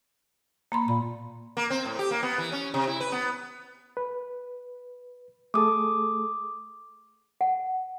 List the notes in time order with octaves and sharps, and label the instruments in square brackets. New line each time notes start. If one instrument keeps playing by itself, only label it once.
[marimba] A#3 B5 C6
[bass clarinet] A#2 [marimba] B5
[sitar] A#3
C4
A2
G4
A#3
B3
E3
C#4
C3
E4
B4
B3
[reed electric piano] B4
[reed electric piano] A3 G#4 A4 [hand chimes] D6 D#6
[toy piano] F#5